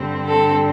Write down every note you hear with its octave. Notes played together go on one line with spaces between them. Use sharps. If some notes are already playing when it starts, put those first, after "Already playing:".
Already playing: G2 D3 G3 C4
A4